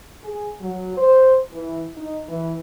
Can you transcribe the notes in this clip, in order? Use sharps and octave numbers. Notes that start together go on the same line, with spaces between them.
G#4
F#3
C5
E3
D#4
E3